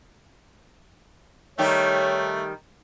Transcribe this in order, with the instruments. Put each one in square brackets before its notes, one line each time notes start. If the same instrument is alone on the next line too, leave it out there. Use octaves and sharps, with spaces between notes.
[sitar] D#3 G3 G4 [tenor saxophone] A3 [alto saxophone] C#5